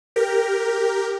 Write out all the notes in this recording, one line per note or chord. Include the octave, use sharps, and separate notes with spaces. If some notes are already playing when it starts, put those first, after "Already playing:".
G4 A#4